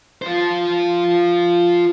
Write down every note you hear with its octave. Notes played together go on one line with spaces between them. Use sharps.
F4 C5